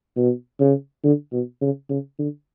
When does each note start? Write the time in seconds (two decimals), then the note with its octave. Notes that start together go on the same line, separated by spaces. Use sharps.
0.17 B2
0.60 C#3
1.04 D3
1.32 B2
1.62 C#3
1.90 C#3
2.19 D3